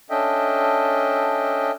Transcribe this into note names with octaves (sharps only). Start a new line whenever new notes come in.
C#4 D4 A4 D#5 E5 G5